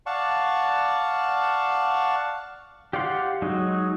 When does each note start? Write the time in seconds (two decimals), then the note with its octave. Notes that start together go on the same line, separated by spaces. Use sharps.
0.06 D5 F5 F#5 A5 C#6
2.93 G4 D5 F5 F#5 C6
3.42 F#3 G#3 D#4